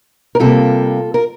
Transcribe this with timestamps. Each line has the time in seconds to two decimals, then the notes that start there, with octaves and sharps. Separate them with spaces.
0.35 A#4
0.40 C3 G3 A#3 F4 A4
1.14 A#4